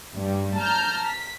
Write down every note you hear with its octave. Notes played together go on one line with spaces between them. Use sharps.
G2 G3
A5 A#5 F6 G6
B6